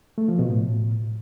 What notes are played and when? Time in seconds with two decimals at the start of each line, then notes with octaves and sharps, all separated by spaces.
0.18 A3
0.28 F3
0.39 B2
0.50 A2